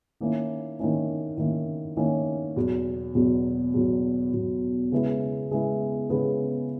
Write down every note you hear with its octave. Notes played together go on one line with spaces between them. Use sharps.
D#3 A#3 C#4 E4
D#3 A#3 C#4 E4
D#3 A#3 C#4 E4
D#3 A#3 C#4 E4
E2 B2 F#3
E2 B2 F#3
E2 B2 F#3
E2 B2 F#3
C#3 G#3 B3 E4 G#4
C#3 G#3 B3 E4 G#4
C#3 G#3 B3 E4 G#4